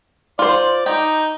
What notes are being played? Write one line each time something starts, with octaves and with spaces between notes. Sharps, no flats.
F4 C5 D5
D#4 G4